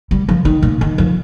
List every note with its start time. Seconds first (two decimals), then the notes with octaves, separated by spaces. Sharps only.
0.11 G3
0.29 F3
0.45 D#3
0.62 A#2
0.81 D#3
0.98 F3